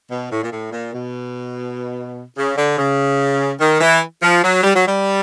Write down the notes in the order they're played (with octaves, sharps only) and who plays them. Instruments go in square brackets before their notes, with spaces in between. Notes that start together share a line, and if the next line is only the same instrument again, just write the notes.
[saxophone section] B2
A2
A#2
A2
A#2
B2
C#3
D3
C#3
D#3
E3
F3
F#3
G3
F#3
G3